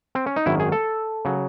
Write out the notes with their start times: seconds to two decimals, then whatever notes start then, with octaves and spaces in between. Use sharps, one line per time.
0.15 C4
0.26 C#4
0.36 D#4
0.46 G#1 F#2 D#3 F#3 E4
0.60 G#4
0.72 A4
1.25 C#3 F#3